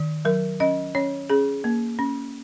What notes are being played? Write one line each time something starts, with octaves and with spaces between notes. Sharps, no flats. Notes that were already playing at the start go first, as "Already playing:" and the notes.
Already playing: D#3
F#3 A#4
C#4 D#5
C#4 C#5
C#4 G#4
A#3
C#4